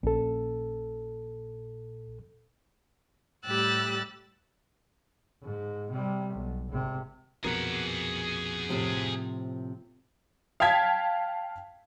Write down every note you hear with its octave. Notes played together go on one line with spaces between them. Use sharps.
A#1 A#2 C#4 A4
A2 G3 G4 E6 F#6 A6
G#2
C3 G3
B1
G#1 C3
A#1 F2 B2 G#4 A#4 F#5
A2 C3 F3
F5 G5 A5 G#6 B6